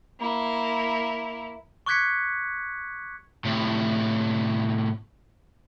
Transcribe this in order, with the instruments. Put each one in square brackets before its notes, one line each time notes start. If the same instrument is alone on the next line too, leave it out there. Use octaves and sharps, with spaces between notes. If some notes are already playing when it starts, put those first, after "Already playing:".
[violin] A#3 E4
[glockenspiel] C#6 D6 F#6 G#6 B6 C#7
[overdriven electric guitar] A2 C3